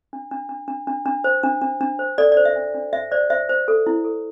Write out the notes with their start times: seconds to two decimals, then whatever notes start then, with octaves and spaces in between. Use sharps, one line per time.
0.13 D4
0.31 D4
0.49 D4
0.68 D4
0.87 D4
1.06 D4
1.24 C5
1.43 D4
1.62 D4
1.81 D4
1.99 C5
2.18 A4 D5
2.32 D5
2.37 C5
2.45 E5
2.56 D4
2.74 D4
2.93 C5 E5
3.11 C5 D5
3.30 C5 E5
3.49 C5
3.68 A4
3.87 E4
4.05 A4